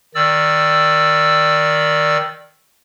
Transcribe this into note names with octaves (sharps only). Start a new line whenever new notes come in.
D#3 D5 E6